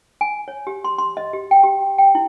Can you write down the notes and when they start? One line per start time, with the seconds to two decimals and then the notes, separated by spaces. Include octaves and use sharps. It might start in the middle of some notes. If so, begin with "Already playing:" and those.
0.21 G#5
0.48 C#5
0.67 G4
0.84 C6
0.98 C6
1.17 D#5
1.33 G4
1.51 G5
1.63 G4
1.98 G5
2.15 E4